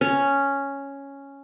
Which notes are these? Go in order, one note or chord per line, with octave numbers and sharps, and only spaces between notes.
C#4